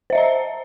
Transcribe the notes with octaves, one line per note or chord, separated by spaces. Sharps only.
C5 D#5 E5 A#5